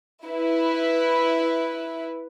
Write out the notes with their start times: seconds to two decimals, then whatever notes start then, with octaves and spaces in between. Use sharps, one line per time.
0.25 E4 B4